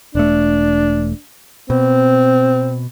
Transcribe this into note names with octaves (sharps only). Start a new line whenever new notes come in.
E1 A3 D4
B2 C4